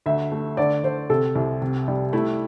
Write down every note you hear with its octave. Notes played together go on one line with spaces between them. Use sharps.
D2 E5
A3
D3 D5
D3 C5
C3 A4
C2
C3
G3
A3 E4